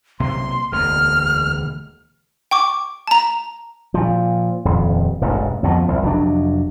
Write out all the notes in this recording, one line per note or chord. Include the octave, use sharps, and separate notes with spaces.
B1 C3 A#3 C6
E1 D2 A#3 F6
G5 C#6 D6
A5 A#5
A#2 F3
D#1 F2
E1 A1 G2
F2 B2 E3 F3
C2
F1 F#3 D4